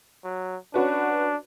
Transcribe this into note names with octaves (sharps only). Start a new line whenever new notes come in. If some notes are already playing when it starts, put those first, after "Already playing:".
F#3
C#4 D4 F#4 B4